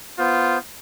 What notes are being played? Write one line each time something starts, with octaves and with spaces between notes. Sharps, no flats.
B3 F4 C5